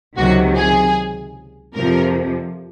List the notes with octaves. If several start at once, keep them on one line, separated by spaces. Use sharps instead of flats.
C#2 C3 D#3 F#3 F#4
G#4
F2 C3 F3 A#4